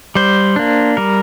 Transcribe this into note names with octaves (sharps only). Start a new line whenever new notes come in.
G3 C5
A#3 D4
G3 A#4